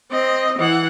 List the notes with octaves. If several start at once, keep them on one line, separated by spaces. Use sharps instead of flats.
C4 D#5
E3 F#5